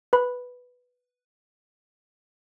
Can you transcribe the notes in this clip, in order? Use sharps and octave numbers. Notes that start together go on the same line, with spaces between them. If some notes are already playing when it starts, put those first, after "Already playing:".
B4 B5